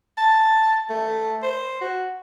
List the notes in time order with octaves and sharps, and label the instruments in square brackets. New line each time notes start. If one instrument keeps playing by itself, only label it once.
[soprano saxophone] A5
A3
C5
F#4